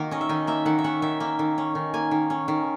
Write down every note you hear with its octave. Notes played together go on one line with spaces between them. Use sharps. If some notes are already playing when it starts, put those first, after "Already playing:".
Already playing: D#3 A#3 F#4 A#4
C#4 D#5
E5
D#3 D#5
A#3 E5
D#3 F#5
E5
C#4 F#5
D#3 E5
A#3 E5
D#3
C#4
D#3
A#3 G#5
D#3
C#4
D#3